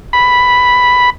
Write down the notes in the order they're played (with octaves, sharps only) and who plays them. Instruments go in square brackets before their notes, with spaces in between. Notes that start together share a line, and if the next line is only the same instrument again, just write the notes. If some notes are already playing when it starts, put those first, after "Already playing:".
[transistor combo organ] B5